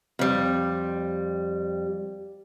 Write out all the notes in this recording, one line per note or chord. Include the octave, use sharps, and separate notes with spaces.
F2 G3